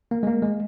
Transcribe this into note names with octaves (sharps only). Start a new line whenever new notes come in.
A#3
G#3
A#3
G#3